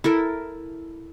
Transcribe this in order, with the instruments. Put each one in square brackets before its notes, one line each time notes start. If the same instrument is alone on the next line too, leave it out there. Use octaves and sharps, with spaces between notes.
[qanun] E4 A4 A#4